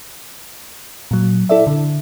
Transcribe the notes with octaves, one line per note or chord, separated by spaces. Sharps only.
A#2 F#3
E4 A4 D5 E5
D3